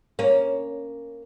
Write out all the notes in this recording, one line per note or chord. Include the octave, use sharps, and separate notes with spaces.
A#3 C#4